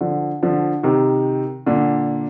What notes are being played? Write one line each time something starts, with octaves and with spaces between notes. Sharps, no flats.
D3 F3
D3 F3
C3 D#3
A#2 D3